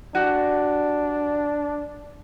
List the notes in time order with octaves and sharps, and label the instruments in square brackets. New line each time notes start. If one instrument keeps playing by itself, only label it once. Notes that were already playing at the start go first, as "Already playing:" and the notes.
[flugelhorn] D4 [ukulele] F#4 G4